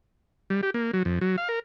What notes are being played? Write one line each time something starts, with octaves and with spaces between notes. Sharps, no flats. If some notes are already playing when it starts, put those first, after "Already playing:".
G3
G4
A#3
F#3
F2
F#3
F5
A#4